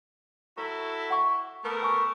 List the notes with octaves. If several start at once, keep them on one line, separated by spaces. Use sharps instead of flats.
E4 F#4 A4 A#5
F#5 C#6
A3 B3 A#4
G#5 C#6